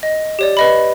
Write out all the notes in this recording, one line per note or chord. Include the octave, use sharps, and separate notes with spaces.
D#5
G4 C#5 D5
B4 D#5 B5